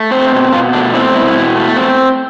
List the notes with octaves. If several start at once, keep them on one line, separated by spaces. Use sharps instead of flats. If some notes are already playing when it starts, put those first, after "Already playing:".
Already playing: A3
C4 C5
B2
B2 F4
A3 D4
C4 E4
B2 E4
B2
A3
C4